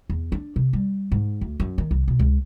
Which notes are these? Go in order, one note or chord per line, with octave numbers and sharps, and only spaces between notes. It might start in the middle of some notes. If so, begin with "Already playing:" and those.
E2
D4
C3
G3
G#2
D2
F#2
D#3
C2
B2
C#2